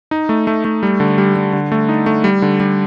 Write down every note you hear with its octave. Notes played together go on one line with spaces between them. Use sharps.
D#4
A3
A3
A3
G3
D3
G3
G3
D3
A3
D#4
A3
G3
D3
G3